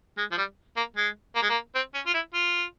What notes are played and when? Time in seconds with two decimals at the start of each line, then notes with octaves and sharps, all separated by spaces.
0.18 G#3
0.31 F3
0.38 G3
0.77 A#3
0.96 G#3
1.35 A#3
1.42 G#3
1.49 A#3
1.75 C4
1.94 C#4
2.06 F4
2.14 E4
2.34 F4